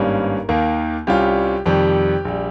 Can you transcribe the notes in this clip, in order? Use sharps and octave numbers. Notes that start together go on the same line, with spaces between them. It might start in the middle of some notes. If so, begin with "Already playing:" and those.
Already playing: G#1 G2 G3 A#3 C#4 A#4
D#2 D#3 A#3
C2 C3 G3 C#4 F4 G4
F2 C3 D#3 G3 G4
A#1 G3